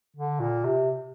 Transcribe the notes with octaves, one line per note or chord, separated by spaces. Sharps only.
D3
A#2
C3